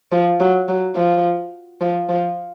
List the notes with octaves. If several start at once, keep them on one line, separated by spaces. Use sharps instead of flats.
F3
F#3
F#3
F3
F3
F3